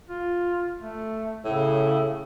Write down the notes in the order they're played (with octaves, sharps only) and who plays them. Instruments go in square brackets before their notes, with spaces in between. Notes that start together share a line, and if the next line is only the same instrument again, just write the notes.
[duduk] F4
A3
[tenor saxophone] A2 [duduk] C#3